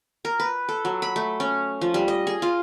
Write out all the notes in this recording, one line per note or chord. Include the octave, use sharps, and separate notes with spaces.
A#4
B4
A4
F#3
B5
A3
C#4
F3
G3
D#5
G#4
F4